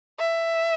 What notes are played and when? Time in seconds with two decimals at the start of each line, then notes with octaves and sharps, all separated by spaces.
0.19 E5